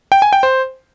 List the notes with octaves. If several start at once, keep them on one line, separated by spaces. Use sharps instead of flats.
G5
G#5
G5
C5